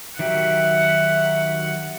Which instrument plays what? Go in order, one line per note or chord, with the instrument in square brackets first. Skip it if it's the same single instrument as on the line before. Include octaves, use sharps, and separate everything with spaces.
[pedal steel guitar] D#3 F#3 G4 [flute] E5 [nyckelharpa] F#5